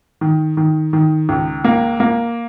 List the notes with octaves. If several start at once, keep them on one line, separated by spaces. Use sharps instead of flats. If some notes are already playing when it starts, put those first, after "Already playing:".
D#3
D#3
D#3
C#2
A#3
A#3